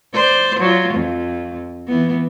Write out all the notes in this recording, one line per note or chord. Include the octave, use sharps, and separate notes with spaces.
C5 D5
F#3 F4
F2
E3 B3